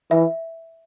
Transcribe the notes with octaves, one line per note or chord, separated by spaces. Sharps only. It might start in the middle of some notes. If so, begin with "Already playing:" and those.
E3 E5